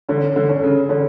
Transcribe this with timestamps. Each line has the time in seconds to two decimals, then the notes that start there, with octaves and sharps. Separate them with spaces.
0.09 D3 C#4
0.36 D3
0.49 C#4
0.63 C#3
0.89 D3 C#4